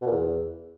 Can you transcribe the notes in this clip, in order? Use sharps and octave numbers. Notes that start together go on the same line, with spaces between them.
B2
A#2
E2